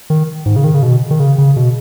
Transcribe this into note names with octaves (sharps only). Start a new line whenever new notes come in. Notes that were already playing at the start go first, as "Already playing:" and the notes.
D#3
G#2
C#3
D#3
C#3
B2
D#3
C#3
C#3
B2